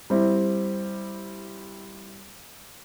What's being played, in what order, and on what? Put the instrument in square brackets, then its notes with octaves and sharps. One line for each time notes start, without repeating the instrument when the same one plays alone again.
[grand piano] G3 C4 E4